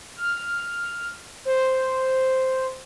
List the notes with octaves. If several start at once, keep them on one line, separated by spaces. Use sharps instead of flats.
F6
C5